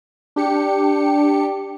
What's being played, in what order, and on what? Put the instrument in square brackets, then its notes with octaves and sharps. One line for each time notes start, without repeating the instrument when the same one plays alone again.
[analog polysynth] D4 G4 C#7